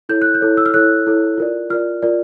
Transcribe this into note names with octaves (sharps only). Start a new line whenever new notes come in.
E4 A4 C#5 G6
F#6
G6
E4 A4 C#5
E6
F6
E4 A4 C#5 F#6
E4 A4 C#5
F4 A#4 D5
F4 A#4 D5 F6
F4 A#4 D5